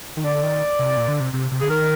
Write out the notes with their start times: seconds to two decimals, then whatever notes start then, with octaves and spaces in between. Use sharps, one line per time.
0.17 D#3
0.24 D3 D5
0.43 D#3
0.79 C3
0.97 A#2
1.08 D3
1.20 C3
1.33 C3
1.51 C3
1.60 D3 G#4
1.69 D#3 A#4